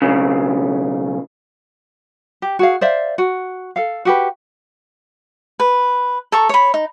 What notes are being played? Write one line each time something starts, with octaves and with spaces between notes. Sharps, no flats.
B1 C#3
G4
F#4 G#4 F5
C5 D5 E5 F5
F#4
A4 F5
F#4 G4 B4
B4
A4 A#5 C#6
C#5 B5
D#4